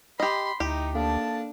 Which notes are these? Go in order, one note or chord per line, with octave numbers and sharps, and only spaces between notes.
G4 D#5 B5 C6
D2 D#4 E4 G4
A#3 D4 A4 F5 A5